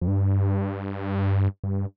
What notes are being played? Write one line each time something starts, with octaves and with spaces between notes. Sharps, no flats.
F2
G2
G2